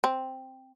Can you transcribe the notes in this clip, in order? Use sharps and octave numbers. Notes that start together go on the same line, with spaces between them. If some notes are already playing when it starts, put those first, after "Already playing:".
C4